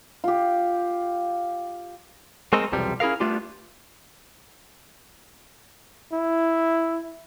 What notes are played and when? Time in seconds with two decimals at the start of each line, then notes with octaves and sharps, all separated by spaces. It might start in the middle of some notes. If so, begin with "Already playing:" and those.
0.24 F4 G4
2.53 G#3 A3 C4 A4 A#4 D#5
2.72 B1 E2 C3 F3 G3
3.00 C#4 E4 G#4 A#4 F5
3.20 G3 A3 B3 D4 F4 G4
6.13 E4